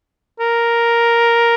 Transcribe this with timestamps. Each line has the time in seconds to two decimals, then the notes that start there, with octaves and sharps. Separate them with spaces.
0.40 A#4